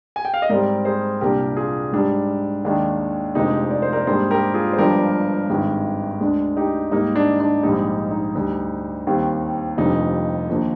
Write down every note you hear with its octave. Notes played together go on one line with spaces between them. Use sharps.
G#5
G5
F5
D#5
G#2 G3 C4 A#4 D5
G#4 C5
C2 A#2 G3 D4 G4 A#4
F4 G#4
G#2 G3 D4
D#2 D#3 G#3 D4
F1 F2 D3 G#3 D#4 G4
D5
C5
A#4 D5
G#2 G3 A#3 D4 G#4 C5
G4 A#4
F4 G#4
C5
G1 G2 F3 G#3 D4 G4 A#4
G#1 G2 D#3 G#3
D2 D3 G#3 D4
D#4 G4
G#2 G3 A#3 D#4
D4
D4
A#1 G#2 G3 D#4
D#4
D2 D3 G3 D4
D#2 D#3 G3 C4
F1 F2 D3 G3 D#4
D#2 D3 F3 A#3